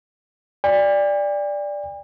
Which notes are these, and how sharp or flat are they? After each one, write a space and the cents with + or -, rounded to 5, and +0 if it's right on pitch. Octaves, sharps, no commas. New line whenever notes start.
D5 +0 G5 +45